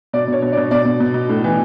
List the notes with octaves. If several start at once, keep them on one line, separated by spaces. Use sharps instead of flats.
B2 D5
B2 C#5
B2
B2 D5
B2 D5
B2
B2
B2
A2
E3